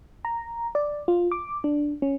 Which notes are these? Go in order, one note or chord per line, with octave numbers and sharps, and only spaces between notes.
A#5
D5
F4
D6
D4
C#4